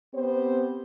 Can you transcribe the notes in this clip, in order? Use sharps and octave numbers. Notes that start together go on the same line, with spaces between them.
B3 C4 G4 C5